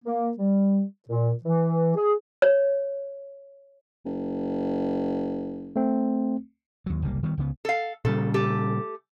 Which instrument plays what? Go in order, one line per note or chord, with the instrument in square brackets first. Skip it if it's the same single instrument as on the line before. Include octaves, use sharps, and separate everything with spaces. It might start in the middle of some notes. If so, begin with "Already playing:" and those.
[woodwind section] A#3
G3
A#2
E3
G#4
[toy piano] C#5
[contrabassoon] F#1
[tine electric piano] A3 C4
[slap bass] D#2 F#3
F#1 C2 G3 A#3
D#3 G3 B3
C#2 C#3 B3
[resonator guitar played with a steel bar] A4 F5
[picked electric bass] A#2 C#3 G3 [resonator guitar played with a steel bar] A4
[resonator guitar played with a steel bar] A3 G4 A4